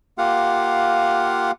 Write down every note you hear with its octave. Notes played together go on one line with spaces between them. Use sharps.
A#3 F4 G4 F5 F#5